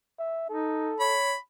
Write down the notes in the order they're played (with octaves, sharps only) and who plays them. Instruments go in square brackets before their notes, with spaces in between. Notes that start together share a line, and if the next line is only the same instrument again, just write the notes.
[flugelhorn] E5
[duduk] D#4 [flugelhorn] A4
[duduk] C#5 [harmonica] B5